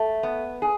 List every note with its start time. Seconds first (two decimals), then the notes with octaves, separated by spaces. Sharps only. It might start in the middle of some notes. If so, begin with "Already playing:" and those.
Already playing: A3
0.23 B3
0.62 G#4